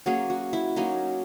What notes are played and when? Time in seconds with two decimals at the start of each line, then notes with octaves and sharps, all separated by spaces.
0.06 F#3 A#3 C#4 G#4
0.30 F#4
0.53 E4
0.76 F#3 A#3 C#4 D#4